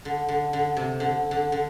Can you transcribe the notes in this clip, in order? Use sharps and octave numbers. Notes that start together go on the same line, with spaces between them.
D3
D3
D3
C3
D3
D3
D3